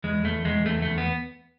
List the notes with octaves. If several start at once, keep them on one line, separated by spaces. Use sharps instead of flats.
E2 G#3
E2 A3
E2 G#3
E2 A3
E2 A3
B3